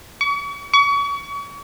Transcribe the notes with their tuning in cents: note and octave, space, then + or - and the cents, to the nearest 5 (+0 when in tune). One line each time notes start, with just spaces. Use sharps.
C#6 +40
C#6 +35